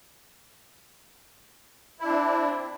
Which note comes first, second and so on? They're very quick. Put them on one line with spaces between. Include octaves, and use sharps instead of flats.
E4 D4 C4